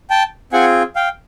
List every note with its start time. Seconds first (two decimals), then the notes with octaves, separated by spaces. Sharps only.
0.10 G5 A5
0.53 C4 F4 G#4 F#5 G#5
0.96 F5 G5